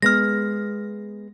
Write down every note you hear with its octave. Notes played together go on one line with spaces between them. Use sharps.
G#3 B3 F6 A#6